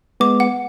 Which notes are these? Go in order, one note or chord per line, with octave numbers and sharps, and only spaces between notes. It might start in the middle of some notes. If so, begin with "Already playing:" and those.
G#3 B3 D6
F#5